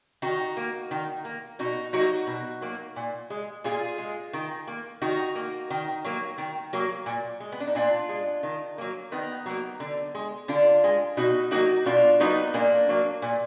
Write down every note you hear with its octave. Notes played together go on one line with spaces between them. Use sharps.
D#3 D#4 F#4
A#3
D#3
A#3
B2 D#4 F#4
F#3 A#3 D#4 F#4
B2
F#3 A#3
A#2
G#3
A#2 F4 G#4
G#3
D#3
A#3
D#3 D#4 F#4
A#3
D#3
F#3 A#3
D#3
F#3 A#3
A#2
G#3
B3
D4
D#4
A#2 D4 F4
G#3
D#3
F#3 A#3
D#3 B3 D#4
F#3 A#3
D3
G#3
D3 D4 F4
G#3
B2 D#4 F#4
F#3 A#3 D#4 F#4
B2 D4 F4
F#3 A#3 B3 D#4
A#2 A#3 D4
F#3 A#3
A#2